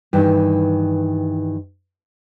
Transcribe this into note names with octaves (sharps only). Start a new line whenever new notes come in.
G2 D#3 E3